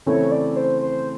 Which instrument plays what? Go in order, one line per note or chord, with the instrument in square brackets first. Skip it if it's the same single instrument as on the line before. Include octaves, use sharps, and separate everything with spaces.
[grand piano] C#3 E3 A3 C4 E4 [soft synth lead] C#5
[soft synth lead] D5
C5
C5